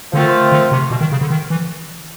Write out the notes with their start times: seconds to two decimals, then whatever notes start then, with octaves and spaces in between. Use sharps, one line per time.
0.12 D3 F3 A3 C4 F4 A#4
0.52 D3
0.72 C3
0.91 B2
1.01 D#3
1.12 C#3
1.21 D3
1.30 D#3
1.50 E3